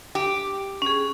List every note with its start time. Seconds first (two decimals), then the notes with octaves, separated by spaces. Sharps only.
0.15 G4
0.82 C#4 G#4